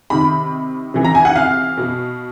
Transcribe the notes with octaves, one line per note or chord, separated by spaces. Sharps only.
C3 D#3 B5
C3 E3
A#5
G#5
F#5
F5
B2